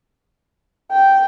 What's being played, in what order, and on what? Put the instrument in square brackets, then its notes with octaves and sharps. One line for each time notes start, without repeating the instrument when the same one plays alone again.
[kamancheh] G5